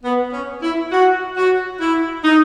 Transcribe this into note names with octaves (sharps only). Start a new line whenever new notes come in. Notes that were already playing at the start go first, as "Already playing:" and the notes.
B3
C#4
E4
F#4
F#4
E4
D#4